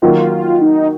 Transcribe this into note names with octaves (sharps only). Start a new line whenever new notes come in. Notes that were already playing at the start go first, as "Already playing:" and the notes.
D#3 F#3 A#3 F4
F4
D#4